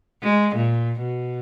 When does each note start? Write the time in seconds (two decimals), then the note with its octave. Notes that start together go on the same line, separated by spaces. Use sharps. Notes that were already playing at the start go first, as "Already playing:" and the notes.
0.23 G#3
0.56 A#2
1.02 B2